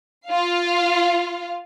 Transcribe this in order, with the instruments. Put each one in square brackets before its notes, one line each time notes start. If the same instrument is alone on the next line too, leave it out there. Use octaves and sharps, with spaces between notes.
[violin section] F4 F5